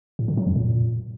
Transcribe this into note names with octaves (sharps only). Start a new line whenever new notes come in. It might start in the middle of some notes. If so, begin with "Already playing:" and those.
A2
D3
F#3
F2
A#2